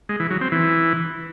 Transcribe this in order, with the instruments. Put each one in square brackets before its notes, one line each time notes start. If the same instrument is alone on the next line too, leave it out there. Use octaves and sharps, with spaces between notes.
[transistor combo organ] G#3
E3
F#3
C4
E3